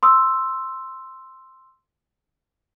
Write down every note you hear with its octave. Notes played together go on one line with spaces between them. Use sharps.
C6 D#6 E6